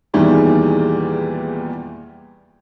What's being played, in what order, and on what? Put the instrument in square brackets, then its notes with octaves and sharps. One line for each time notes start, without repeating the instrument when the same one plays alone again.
[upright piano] E2 A#2 D#3 E3 G3 G#3